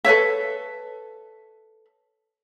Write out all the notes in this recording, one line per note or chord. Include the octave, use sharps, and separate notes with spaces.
A4 B4 C#5 E5